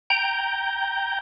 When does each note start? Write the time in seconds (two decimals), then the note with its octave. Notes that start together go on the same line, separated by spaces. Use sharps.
0.10 G5 A#5 G6